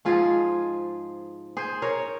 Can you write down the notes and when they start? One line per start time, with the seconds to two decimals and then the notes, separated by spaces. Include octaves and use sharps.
0.05 G#2 F3 G#3 F4 G#4
1.57 G#4 C5
1.82 A#4 C#5